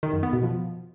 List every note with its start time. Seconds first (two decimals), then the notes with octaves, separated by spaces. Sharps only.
0.03 D#3
0.13 F#2
0.23 B3
0.33 B2
0.43 F3